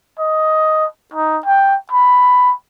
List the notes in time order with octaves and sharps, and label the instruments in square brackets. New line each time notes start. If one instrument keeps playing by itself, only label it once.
[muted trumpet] D#5
D#4
G5
B5